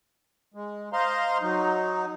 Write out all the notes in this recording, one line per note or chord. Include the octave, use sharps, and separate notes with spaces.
G#3
C5 D#5 F5 A#5 C6
F#3 D#4